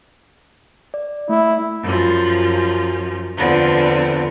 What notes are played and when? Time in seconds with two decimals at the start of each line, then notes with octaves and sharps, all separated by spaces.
0.94 D5
1.29 A3 E4
1.83 F#2 F3
3.37 E2 D3 F3 B3 C4